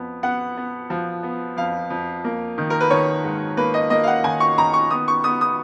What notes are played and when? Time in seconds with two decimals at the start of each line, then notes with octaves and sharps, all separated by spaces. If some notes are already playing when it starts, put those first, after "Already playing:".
Already playing: F2 B3
0.23 B3 F#5
0.57 B3
0.90 F3
1.23 B3
1.57 F2 F5
1.90 F2
2.24 A#3
2.58 D#3
2.70 A#4
2.80 B4
2.90 D#3 C#5
3.24 G#2
3.57 A#3 B4
3.74 D#5
3.90 A#3 D#5
4.03 F5
4.07 F#5
4.24 D#3 G#5
4.40 C#6
4.58 D#3 A#5
4.74 C#6
4.90 B3 D#6
5.08 C#6
5.24 B3 D#6
5.41 D#6